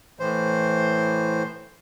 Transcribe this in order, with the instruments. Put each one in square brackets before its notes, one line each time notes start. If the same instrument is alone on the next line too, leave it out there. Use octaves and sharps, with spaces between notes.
[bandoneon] A2 E3 C5